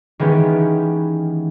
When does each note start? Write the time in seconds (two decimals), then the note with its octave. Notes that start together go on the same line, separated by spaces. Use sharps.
0.19 D#3 E3 G#3 B3 C#4 G4